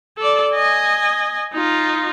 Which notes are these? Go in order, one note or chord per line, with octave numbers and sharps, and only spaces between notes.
A4 D5
D#5 G#5
D#4 F4